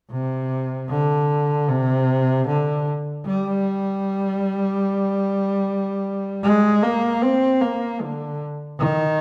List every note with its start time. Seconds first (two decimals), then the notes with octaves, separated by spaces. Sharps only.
0.11 C3
0.89 D3
1.68 C3
2.47 D3
3.26 G3
6.43 G#3
6.83 A#3
7.22 C4
7.62 A#3
8.02 D3
8.80 D#3